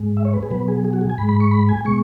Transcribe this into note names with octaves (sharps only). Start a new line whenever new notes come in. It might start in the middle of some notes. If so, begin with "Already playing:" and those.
Already playing: G#2 G#3
E5
C#5
B4
G#4
B2 F#3 B4
G#4
G#4
F#4
G#4
G#5
G#2 G#3 B5
B5
C#6
B5
G#5
B2 G#3 C#6